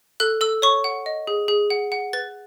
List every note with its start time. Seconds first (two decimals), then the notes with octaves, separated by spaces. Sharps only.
0.20 A4 F#6
0.41 A4 E6
0.62 C#5 C#6
0.84 F#5
1.06 D#5
1.27 G#4
1.48 G#4
1.70 F#5
1.92 F#5
2.13 B4 A6